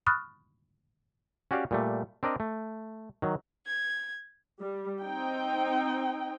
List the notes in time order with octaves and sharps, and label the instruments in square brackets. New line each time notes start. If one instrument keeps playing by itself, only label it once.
[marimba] B5 C#6 D#6 F6 F#6 A6
[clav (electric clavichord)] C#4 F#4 G4 D5 F5
A#2 G3 A3
C4 D4 A#4 D5 D#5
A3
D#3 F#3
[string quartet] G#6
[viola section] G3
C4 D#4 G5